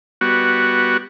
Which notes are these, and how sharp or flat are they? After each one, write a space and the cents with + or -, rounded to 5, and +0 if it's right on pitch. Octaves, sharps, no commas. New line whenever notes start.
G3 +0 B3 -10 F#4 +0